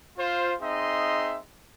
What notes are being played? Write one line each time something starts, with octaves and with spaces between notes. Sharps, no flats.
F4 C5
C4 D#4 G#4 D#5 E5 C6